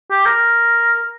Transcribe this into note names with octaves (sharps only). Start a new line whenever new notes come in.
G4
A#4